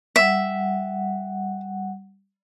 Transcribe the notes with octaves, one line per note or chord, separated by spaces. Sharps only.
G3 E5 F#5